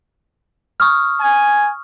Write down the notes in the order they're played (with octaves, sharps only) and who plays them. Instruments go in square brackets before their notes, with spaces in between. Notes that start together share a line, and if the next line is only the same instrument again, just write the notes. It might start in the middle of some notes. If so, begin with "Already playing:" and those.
[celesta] C#6 D#6 F6
[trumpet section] G#5